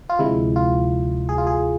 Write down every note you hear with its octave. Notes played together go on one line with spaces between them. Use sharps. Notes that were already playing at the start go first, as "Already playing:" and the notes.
F4
D2 C3 F3 G#3 E4
F4
G#4
F4
G#4